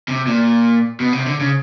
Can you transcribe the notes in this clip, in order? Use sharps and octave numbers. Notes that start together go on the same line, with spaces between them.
C3
A#2
B2
C3
D3
C#3